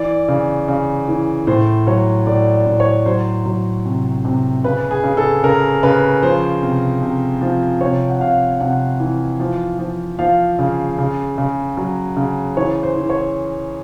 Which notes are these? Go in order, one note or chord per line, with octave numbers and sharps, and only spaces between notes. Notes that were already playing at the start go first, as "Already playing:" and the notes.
Already playing: E3 D5
C#3
C#3
E3
A2 C5
F#3 C#5
A2 D5
D5
A2
C#5
F#3 C5
F#3
C3
C3
C#3 B4
G#4
C#3
A4
C#3 A#4
C#3 B4
F3 C5
C3
C3
F3
C3 C#5
F#5
C3 F5
C3 F#5
E3
F3
F3
F3 F5
C#3
C#3
C#3
F#3
C#3
E3 C#5
C5
E3
C#5